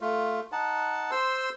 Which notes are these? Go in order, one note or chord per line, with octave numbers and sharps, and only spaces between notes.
A3 F4
D#4 F#5 A5
C5 C6 E6